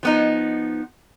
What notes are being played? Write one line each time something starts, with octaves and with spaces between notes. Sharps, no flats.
F3 B3 D#4